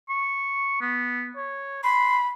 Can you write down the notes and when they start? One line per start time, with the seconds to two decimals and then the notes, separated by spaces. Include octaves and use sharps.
0.09 C#6
0.81 B3
1.36 C#5
1.84 B5 C6